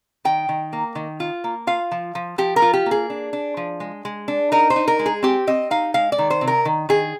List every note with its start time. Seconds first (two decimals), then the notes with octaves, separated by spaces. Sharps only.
0.25 D#3 G5
0.49 D#3
0.73 A#3
0.95 D#3
1.20 F4
1.44 A#3
1.67 F4 F5
1.91 F3
2.15 F3
2.38 F3 G4
2.56 A#4
2.62 F4
2.73 G4
2.86 A#3
2.91 G#4
3.10 D4
3.33 D4
3.57 F3
3.80 G#3
4.05 G#3
4.28 D4
4.52 D#4 A#4
4.70 C5
4.76 D#4
4.88 A#4
4.99 G#3
5.06 G#4
5.23 C4 G4
5.47 C4 D#5
5.71 D#4 F5
5.94 G#3 F5
6.12 D5
6.18 D#3
6.30 C5
6.41 C3
6.47 A#4
6.65 D#3
6.89 D#3 G#4